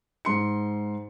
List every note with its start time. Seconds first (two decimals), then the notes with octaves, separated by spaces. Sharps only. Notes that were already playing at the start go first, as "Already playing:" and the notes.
0.25 G#2 C6 C#7